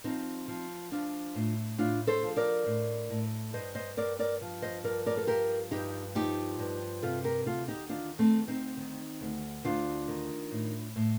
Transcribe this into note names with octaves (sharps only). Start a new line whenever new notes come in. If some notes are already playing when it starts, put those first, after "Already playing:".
F3 C4 D#4
F3
F3 D4 F4
A2
A2 D4 F4
A4 C5
F3
A#4 D5
A2
A2
G2 C5 D#5
C5 D#5
G2 A#4 D5
A#4 D5
F3
C5 D#5
G2 A#4 D5
A#4 D5
A4
F3 G4 A#4
G2 D#4 G4
F3 D#4 G4
G2
C3 F4 A4
G4 A#4
D2 F4 A4
D#4 G4
D#3 D4 F4
A3 C4
D2
C4 D#4
D#3
D2
D2 D4 F4
D#3
A2
A2